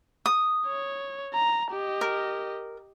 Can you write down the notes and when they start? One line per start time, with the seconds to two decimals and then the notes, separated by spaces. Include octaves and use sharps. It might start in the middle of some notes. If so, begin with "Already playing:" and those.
0.26 D#6
0.67 C#5
1.34 A#5
1.71 G4 D#5
2.01 A#4